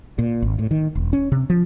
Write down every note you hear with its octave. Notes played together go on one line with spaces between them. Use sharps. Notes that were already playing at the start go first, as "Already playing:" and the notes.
A#2
G#1
A2
D#3
E1
C#4
C3
F3